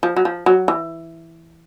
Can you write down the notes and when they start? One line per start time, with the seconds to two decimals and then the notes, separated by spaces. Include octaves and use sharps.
0.03 F3
0.16 F#3
0.25 F3
0.46 F#3
0.68 E3